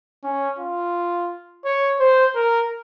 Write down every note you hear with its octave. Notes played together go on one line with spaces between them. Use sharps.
C#4
F4
C#5
C5
A#4